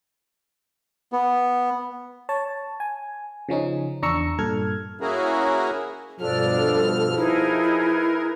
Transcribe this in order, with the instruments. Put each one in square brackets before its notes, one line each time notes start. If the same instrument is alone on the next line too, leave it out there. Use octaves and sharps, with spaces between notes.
[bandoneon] B3
[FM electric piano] C#5 A5
G#5
C#3 F3 C#4 D#4
E2 D4 A#5 C#6 E6 C#7
G2 A#2 A4 F6 G#6
[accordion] A#3 C#4 E4 F#4 G#4 A#4
[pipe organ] G2 B2 F6 [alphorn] F3 [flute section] D4 [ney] A4
[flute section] D#4 G#4 B4 [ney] E4 [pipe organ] A#4